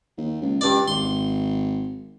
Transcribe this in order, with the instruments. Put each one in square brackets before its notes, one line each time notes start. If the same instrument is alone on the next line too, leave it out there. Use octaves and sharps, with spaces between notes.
[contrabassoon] D#2
C#2
[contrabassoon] C#2 [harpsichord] G2 D5
[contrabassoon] G#1 [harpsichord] C6